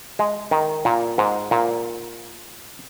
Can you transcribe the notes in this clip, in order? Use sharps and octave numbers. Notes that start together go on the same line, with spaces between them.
G#3
D#3
A#2
G#2
A#2